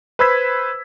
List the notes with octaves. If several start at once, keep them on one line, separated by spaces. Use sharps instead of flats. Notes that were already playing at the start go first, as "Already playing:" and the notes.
B4 C5 B5 E6 G#6 B6